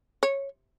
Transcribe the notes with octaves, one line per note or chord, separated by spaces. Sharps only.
C#5